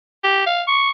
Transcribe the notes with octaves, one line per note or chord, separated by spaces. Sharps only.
G4
F5
C#6